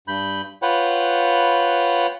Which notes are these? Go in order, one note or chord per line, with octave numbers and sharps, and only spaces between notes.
G2 B5 G6
F4 B4 C#5 F#5 G5 B5